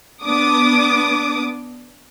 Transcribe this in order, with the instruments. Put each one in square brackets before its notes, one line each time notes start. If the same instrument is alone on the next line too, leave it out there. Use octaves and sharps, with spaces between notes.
[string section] B3 D4 D6 D#6